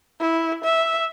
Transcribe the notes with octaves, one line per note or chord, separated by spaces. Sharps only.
E4
E5